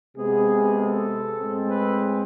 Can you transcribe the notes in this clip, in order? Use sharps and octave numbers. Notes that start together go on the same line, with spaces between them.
C3 G#3 B3 G#4
A4
A2 G#3 C4
B4